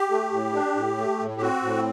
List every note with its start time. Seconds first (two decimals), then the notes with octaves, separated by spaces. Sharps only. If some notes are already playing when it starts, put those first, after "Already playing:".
Already playing: G4
0.10 A3
0.31 A2
0.53 D4
0.75 A2
0.97 A3
1.20 A2
1.37 G4
1.41 C4 F#4
1.62 A2